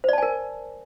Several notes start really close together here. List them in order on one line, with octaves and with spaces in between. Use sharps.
C5 D5 A5 G#5 A#4